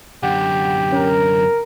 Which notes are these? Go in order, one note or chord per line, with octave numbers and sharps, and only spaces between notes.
F#2 D3 G4 F#5
C#4 A#4